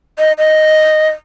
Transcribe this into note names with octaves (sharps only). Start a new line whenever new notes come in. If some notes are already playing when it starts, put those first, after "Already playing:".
D#5
D#5